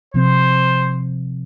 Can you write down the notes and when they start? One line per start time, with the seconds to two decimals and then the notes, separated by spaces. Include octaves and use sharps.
0.14 C3 F3 C4 C5